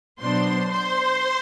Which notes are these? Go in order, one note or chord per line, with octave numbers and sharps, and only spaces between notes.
B2 F#3 B3 D4 C5 C6
C5 C6